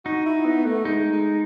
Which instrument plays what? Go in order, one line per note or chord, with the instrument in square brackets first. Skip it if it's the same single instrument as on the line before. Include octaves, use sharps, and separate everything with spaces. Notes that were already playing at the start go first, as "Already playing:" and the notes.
[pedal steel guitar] D#4 [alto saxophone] F#4
[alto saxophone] E4
B3
A3
[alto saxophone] G#3 [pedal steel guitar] D#4
[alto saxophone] G#3